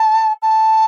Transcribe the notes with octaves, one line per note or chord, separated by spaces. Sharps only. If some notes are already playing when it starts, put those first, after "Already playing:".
Already playing: A5
A5